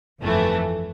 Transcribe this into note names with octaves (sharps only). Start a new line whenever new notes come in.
G1 F2 E3 A3